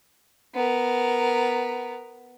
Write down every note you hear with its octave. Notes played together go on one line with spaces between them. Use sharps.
B3 A#4